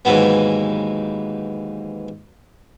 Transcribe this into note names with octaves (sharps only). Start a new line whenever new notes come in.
D#2 G#2 E3 F#3 B3